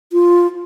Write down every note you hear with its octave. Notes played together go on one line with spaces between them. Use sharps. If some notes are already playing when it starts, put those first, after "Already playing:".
F4